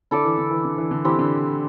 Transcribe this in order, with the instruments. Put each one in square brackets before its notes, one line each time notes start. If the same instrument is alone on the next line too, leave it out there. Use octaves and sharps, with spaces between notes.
[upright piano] D3 [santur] E4 A4 D5
[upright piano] E3
D3
E3
D3
E3
D3
[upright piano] E3 [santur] C4 E4 G4
[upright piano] D3